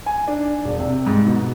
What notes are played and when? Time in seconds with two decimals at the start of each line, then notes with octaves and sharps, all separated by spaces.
0.06 G#5
0.28 D4
0.64 E1
0.79 C3
1.06 G#2
1.27 B2